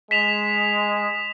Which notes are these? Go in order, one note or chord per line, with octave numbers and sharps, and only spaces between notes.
G#3 B6 E7 F7